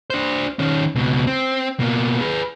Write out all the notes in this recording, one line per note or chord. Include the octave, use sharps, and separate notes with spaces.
D4 C5
D#3 C#4
C#2 B2
C4
B2 A#3
G#4 B4